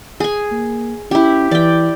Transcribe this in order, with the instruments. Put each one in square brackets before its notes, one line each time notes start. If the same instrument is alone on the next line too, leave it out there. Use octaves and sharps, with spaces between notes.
[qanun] G#4 G#5
[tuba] A#3
[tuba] C#4 [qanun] E4 G4
[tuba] E3 [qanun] D5 G5